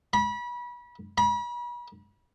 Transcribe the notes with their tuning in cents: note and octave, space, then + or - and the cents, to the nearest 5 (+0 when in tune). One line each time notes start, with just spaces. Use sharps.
B5 -30
B5 -40